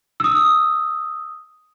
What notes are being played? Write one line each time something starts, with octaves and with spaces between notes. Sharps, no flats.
D#6 E6